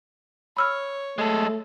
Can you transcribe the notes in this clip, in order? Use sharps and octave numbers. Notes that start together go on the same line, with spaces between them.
C#5 B5 E6 F6
G#3 A3 A4